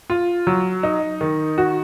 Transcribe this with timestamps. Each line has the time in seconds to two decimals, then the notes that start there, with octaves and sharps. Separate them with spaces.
0.10 F4
0.47 F#3
0.83 D#4
1.21 D#3
1.58 F#4